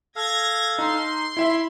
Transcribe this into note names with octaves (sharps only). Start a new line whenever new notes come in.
A4 F5 G#6 A#6
D#4 C6
E4 E5 B5